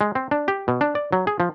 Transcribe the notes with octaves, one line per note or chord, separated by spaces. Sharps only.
G#3
C4
D4
G4
B2
D4
D5
F#3
G#4
F3